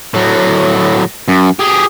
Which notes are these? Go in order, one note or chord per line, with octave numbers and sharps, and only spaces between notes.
A2 F#3
F#2
G4 G#4